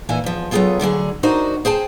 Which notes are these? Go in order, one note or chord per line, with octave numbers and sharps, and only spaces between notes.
A#2 E3 E4 G#5
E2 F3
F#3 B3 C4 F4 G#4 A4
D2 D3 F#3 G#4
D4 D#4 F#4 A#4 C5
G#4 C5 G5 A5